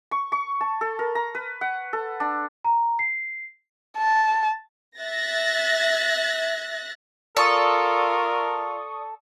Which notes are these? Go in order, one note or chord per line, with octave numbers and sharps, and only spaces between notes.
C#6
C#6
A5
A4
A#4
A#5
B4
F#5
A4
D4
A#5
C7
A5
E5 F#6 A6 A#6
F4 A4 A#4 D5 C#6 D#6